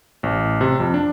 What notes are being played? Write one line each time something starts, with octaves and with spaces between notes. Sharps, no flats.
A1
C3
F2
D4